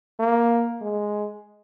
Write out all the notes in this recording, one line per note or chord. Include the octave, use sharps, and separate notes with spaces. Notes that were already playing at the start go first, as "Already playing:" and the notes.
A#3
G#3